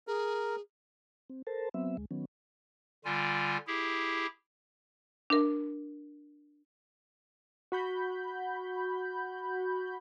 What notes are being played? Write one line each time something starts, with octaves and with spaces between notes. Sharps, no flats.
G#4 A#4
C4
A4 A#4 C5 A5
F#3 B3 C4 E5
D2 G#3
D#3 F#3 B3 C#4
D3 G3 F4 G#5
E4 G4 G#4
D4 A#4
F#4 B5 G6